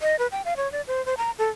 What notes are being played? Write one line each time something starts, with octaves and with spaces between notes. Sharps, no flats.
D#5
B4
G5
F5
C#5
D5
C5
C5
A#5
A4